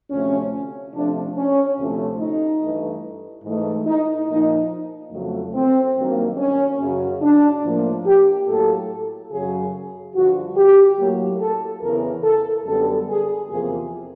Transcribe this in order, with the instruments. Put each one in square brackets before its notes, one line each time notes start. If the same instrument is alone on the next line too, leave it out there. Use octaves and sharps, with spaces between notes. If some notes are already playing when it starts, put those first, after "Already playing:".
[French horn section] D2 C3 F3 A3 C#4
C3 F3 A3 D4
C#4
D2 C3 F3 A3
D#4
G2 E3 A3
G#2 E3 A3
D#4
A#2 F3 A#3 D#4
F2 C#3 F#3 A3
C4
G2 D#3 F#3 A#3
C#4
F#2 C#3 F#3
D4
A2 F3 A#3
G4
A2 F#3 A#3 A4
F#2 C#3 F#3 G#4
G2 D3 F3 F#4
G4
A2 F#3 A#3
A4
E2 C#3 E3 A#4
A4
F#2 D3 G3 B3 A4
G#4
E2 C3 F3 A#3 G#4